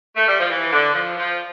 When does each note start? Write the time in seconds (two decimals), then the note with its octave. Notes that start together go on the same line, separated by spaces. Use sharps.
0.17 A3
0.28 G3
0.39 F3
0.50 E3
0.72 D3
0.94 F3
1.17 F3